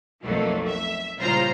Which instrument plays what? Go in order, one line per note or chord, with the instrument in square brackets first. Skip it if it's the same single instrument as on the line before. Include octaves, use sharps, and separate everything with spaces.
[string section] B1 F2 F#3 A3 A#3
E5
A#1 G2 C#3 F4 C5 A#5